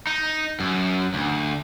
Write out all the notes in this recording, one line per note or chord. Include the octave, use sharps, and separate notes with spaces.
D#4
F#2
D2